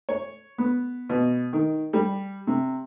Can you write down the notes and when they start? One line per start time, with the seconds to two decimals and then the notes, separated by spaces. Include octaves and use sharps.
0.09 C#5
0.58 B3
1.10 B2
1.53 D#3
1.93 G3
2.47 C3